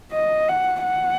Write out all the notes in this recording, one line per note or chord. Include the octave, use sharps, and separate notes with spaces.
D#5
F#5
F#5